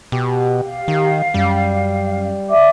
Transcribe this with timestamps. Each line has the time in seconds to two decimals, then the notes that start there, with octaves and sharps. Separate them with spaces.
0.12 B2 G4
0.60 F5
0.88 D#3
1.34 F#2 G3
2.49 D5 E5 D6